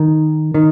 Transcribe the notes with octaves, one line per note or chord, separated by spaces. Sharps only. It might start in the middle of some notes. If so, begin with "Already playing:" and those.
Already playing: D#3
D#3